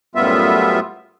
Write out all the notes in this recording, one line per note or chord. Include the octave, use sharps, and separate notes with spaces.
F#2 A2 G3 B3 F4 E5